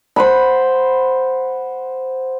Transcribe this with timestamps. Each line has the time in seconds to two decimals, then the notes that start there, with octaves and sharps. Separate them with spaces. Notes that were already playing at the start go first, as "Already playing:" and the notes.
0.16 C5 F#5 B5